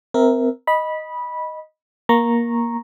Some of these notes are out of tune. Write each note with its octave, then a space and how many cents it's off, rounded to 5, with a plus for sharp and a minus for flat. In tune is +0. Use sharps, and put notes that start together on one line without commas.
C4 -25 A#4 +0 E5 -10
D#5 +0 B5 -15
A#3 +15 A#5 +0 C#6 -15